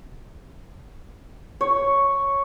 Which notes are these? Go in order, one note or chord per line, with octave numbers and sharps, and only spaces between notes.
C#5